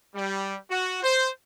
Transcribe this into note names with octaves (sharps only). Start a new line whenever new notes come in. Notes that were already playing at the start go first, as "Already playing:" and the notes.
G3
F#4
C5